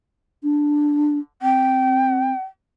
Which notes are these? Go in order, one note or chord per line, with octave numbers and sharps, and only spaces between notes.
D4
C4 G5